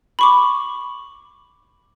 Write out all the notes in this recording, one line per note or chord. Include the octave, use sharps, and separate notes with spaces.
B5 C#6 D6